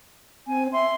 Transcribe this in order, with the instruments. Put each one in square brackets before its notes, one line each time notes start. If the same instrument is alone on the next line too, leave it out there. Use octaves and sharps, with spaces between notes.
[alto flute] C4 [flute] G#5
[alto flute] E5 [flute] C6